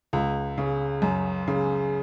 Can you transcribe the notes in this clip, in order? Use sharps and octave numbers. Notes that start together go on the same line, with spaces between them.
C#2
C#3
F#2
C#3